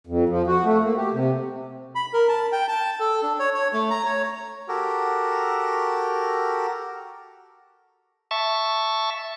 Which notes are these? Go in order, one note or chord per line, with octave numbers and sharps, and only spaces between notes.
F2
F3
F#4
A3
A#3
G4
C3
B5
A#4
A5
G5
A5
A4
D4
C#5
C#5
A3
A#5
C#5
F#4 G4 A4 A#4
E5 A5 C#6